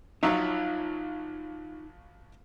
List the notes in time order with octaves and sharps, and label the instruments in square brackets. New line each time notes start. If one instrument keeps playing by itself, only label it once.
[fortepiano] A#1 F#3 E5 [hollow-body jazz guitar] D#4 F4 C#5